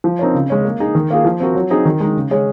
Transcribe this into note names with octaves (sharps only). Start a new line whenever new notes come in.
F3
C4 D#4 A#4 C#5
C#3
G#3 C#4
A#3
D#4 G#4
D#3
A#3 F4 G#4
F3
C4 F#4 A#4
F#3
C4 D#4 G#4
D#3
G#3 D#4
C#3
G#3 C#4 G#4 C#5